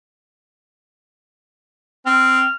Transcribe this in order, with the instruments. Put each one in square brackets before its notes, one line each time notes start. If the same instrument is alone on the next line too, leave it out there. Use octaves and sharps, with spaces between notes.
[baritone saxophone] C4 [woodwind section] F6